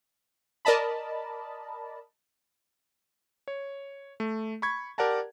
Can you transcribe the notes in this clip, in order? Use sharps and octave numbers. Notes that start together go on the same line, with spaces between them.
A#4 D5 D#5 A5 B5
C#5
A3
B5 C#6 G#6
G4 A#4 D5 F#5 A5 A#5